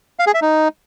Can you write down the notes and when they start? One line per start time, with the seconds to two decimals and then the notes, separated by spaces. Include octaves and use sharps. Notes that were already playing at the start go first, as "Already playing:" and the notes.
0.19 F5
0.27 G#4
0.34 E5
0.42 D#4